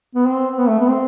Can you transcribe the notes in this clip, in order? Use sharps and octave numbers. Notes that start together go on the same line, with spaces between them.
B3
C4
B3
A3
B3
C4